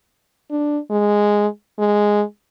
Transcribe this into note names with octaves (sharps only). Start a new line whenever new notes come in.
D4
G#3
G#3